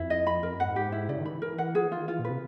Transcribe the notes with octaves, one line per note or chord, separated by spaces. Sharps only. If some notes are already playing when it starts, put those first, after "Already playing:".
Already playing: F2 E4
D#5
B5
F2 A#4
F#2
F#5
G#2
G4
E4
C#3 D5
D#3
B5
E3
A#4
F#5
F3 G#4
E3
D#3 F4
E3 F4
A#2
B4
C3